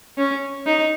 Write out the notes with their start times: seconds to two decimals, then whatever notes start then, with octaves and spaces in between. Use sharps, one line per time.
0.18 C#4
0.67 D#4